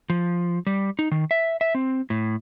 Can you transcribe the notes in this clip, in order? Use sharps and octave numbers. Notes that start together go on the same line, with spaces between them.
F3
G3
D#4
D#3
E5
E5
C4
A2